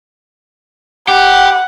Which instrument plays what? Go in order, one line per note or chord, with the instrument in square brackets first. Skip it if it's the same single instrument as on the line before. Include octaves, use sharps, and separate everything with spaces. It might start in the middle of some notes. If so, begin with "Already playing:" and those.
[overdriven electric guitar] G4 [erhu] F#5